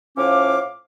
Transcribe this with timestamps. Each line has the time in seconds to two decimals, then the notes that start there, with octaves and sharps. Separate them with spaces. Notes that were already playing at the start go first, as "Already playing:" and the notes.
0.17 A2 F3 C#4 F5 D6